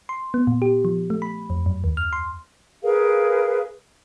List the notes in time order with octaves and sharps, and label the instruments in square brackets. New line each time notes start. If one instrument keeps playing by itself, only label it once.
[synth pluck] C6
B3
A#2
G4
F3
A3
B5
F2
F#2
D#2
F6
C6
[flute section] G#4 A#4 B4 F5